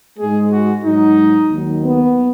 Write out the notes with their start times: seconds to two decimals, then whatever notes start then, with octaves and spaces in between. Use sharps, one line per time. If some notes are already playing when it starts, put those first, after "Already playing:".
0.18 G#2 G#3 G#4
0.52 F#4
0.84 G#2 F#3 D#4
1.51 D#2 D#3 F#3
1.84 B3